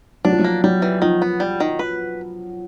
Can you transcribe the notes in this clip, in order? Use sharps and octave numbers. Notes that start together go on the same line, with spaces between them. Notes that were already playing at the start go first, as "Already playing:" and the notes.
F#3 D4
F3
F#3
A#3
F#3 G3
E3
D#3 F3
B3
G3
D#3
B4